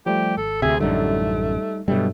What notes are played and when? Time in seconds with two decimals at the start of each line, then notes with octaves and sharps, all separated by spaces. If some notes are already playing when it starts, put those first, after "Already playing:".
0.06 F3 G3 A3 G4
0.37 G#1 A4
0.62 D2 C3 G#4 E5
0.80 A1 F#2 D3 G3 A3 D#4
1.88 G2 B2 F#3 G3 A3